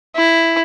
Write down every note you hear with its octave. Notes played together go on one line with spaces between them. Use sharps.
E4